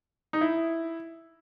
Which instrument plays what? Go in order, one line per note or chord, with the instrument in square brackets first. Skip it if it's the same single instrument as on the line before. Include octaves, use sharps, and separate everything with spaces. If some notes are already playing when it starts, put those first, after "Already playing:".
[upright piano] D#4
E4